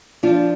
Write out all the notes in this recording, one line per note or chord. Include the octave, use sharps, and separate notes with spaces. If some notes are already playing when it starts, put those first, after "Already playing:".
F3 D4 F4